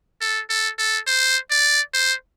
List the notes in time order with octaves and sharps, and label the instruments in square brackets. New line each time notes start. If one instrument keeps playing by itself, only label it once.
[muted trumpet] A4
A4
A4
C5
D5
C5